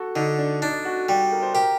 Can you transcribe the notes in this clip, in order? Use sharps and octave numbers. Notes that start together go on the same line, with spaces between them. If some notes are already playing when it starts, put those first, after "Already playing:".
Already playing: F#4 A4
D3 D#4
D4
D4 D#4
F#4
G3
A#4
C5
G4 A#4